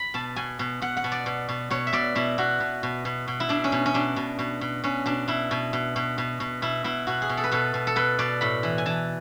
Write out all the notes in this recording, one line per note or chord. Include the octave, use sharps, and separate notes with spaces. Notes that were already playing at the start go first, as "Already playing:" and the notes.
Already playing: B5
B2 A5
B2 G#5
B2
B2 F#5
F#5
B2
D5
B2
B2
B2 C#5
E5
B2 D5
B2 E4
B2 F#4
B2
B2
B2
B2
E4
B2 D4
C#4
B2
C#4
B2 D4
B2
B2
B2
B2 C#4
B2 D4
B2 E4
B2
B2
B2
B2
B2
B2 E4
B2 E4
B2 F#4
G#4
B2
A4
B4
B2 A4
B2
A4
B2 B4
B2 D5
A2 B5
E3
G#5
E3 A5